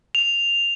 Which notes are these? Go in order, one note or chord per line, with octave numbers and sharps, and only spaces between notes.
F7